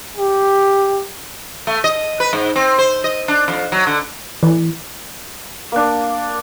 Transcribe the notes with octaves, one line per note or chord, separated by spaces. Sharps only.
G4
A3
D#5
B4
G#2
C4
C5
D#5
D4
F2
F#3
D3
E3
A#3 D4